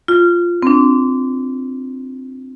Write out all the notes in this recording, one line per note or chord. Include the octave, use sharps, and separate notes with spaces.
F4
C4
D4